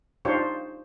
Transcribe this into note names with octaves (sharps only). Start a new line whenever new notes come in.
D4 D#4 F4 G4 C5 C#5